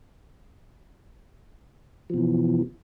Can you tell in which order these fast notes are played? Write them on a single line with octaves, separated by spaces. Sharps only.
F3 B2 E3